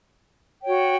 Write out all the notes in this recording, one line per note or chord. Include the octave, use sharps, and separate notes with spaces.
F#4 C#5 G5